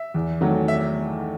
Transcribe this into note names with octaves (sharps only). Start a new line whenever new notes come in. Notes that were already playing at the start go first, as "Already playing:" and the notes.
Already playing: E5
E2
D#3 F#3 A3
E5